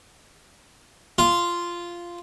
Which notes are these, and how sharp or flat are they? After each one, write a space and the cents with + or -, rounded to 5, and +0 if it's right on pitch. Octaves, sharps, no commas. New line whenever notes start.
F4 -10